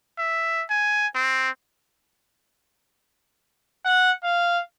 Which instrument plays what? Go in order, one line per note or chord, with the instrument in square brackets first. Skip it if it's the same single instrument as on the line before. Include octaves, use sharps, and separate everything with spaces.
[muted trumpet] E5
G#5
C4
[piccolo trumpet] F#5
F5